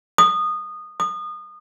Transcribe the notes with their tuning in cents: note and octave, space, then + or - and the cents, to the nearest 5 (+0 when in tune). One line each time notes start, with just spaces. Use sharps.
D#6 -20
D#6 -30